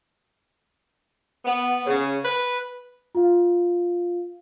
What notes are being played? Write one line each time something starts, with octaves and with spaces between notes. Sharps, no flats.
B3
C#3
B4
F4 F5